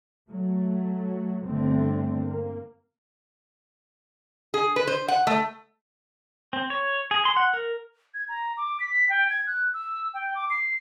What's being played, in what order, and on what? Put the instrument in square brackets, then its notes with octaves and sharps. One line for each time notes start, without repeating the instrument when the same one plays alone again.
[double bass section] F#3 A3
G1 D3 A3 C4
A#3
[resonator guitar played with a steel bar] G#4
B4
C5
F#5
A3
[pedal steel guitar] C4
C#5
G#4
C6
F#5
A#4
[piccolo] G#6
A#5
D6
B6
G5
G#6
F#6
E6
G5
D6
C7